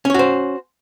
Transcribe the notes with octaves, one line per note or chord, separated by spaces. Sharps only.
C#4 F#4 C5 C#5